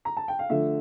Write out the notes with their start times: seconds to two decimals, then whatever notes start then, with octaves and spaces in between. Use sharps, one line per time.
0.05 A#5
0.17 A5
0.28 G5
0.39 F5
0.50 D3 F3 A3 E5